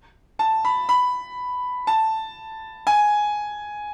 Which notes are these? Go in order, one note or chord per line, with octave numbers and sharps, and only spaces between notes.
A5
B5
B5
A5
G#5